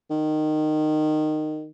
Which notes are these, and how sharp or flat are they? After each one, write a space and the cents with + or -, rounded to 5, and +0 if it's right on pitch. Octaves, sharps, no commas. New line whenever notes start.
D#3 -15